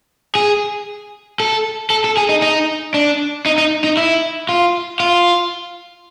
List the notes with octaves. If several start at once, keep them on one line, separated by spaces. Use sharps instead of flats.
G#4
A4
A4
A4
G#4
D#4
D#4
D4
D#4
D#4
D#4
E4
F4
F4